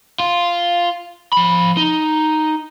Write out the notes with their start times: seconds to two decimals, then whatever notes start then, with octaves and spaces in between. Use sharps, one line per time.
0.20 F4
1.33 F3 B5
1.77 D#4